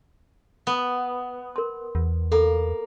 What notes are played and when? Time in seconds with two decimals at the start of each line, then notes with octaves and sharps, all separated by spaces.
0.67 B3
1.56 A#4 C6
1.95 E2
2.32 A#3 A4 B5